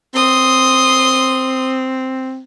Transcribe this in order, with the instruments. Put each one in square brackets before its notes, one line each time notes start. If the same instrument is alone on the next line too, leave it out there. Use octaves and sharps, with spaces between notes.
[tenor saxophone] C4 [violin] C6 D#6